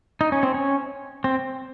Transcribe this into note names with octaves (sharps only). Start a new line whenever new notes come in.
D#4
C#4
C4
C#4
C4